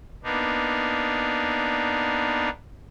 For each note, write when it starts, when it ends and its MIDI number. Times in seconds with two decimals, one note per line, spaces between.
0.24 2.49 58
0.24 2.49 59
0.24 2.49 62
0.24 2.49 63